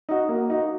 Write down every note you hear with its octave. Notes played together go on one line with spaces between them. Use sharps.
D#4 F#4
A#3
D#4 F#4